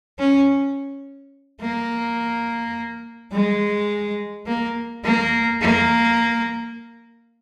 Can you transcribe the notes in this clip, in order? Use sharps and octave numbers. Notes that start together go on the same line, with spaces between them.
C#4
A#3
G#3
A#3
A#3
A#3